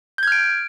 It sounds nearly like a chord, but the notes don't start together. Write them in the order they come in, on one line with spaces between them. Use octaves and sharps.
G6 G#6 F6 D7